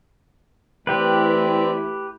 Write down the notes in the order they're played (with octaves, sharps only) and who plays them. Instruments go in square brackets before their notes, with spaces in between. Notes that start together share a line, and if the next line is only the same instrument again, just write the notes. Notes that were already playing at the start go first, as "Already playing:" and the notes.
[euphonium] E3 [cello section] A3 E4 [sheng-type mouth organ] C4 D5 E5 [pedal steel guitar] G4 B4